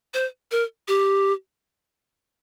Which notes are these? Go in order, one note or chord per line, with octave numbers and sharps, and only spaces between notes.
C5
A#4
G4